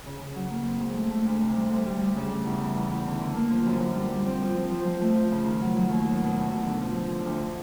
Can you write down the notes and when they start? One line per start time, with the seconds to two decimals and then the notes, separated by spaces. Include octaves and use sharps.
0.06 C#3
0.21 C#3
0.36 F#3
0.51 A#3
0.66 C4
0.81 G#2
0.96 A3
1.11 A3
1.26 D2
1.42 C3
1.56 G3
1.71 D2
1.86 G3
2.00 G3
2.16 C#3
2.31 G3
2.45 E2
2.61 E3
2.76 E2
2.91 E2
3.06 D3
3.21 D3
3.35 A#3
3.50 F3
3.67 F#2
3.80 F#2
3.96 G3
4.11 G3
4.26 C4
4.42 F3
4.57 C4
4.71 F3
4.86 F3
5.01 A3
5.16 F3
5.31 C#3
5.46 D#3
5.61 F#3
5.76 F#3
5.91 D#2
6.06 F#3
6.21 B2
6.36 E2
6.50 B2
6.65 D3
6.80 F3
6.96 F3
7.11 D3
7.26 D2